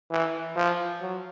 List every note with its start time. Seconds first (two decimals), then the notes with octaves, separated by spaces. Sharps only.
0.11 E3
0.56 F3
1.01 F#3